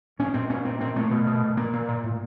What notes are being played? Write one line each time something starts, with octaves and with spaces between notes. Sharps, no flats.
A#2 C#4
A#2 C4
A#2 C#4
A#2 C4
A#2 C4
A#2 A3
B2
B2
B2
A#2 A#3
A#2
A#2
A2